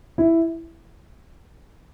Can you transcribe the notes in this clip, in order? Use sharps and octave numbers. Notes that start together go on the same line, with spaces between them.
E4